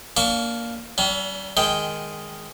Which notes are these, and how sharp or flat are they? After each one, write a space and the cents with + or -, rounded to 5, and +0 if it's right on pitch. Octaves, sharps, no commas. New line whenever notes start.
A#3 +0 D4 -30 C#6 +35
G3 -30 C#4 +40
D#3 +0 G#3 +0 G5 +0